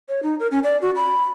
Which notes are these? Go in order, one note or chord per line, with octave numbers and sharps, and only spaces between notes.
C#5
D#4
A#4
C#4
D5
F#4
B5